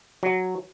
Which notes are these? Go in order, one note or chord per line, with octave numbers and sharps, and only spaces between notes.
F#3